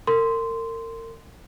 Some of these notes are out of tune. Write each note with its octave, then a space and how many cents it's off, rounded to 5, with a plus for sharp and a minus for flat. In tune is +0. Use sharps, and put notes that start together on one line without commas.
A#4 -40 C6 -10